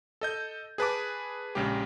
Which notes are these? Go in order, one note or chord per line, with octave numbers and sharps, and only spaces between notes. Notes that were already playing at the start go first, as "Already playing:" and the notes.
A4 D#5 G6
G#4 B4 A5 D6
A#1 C#3 G#3 G4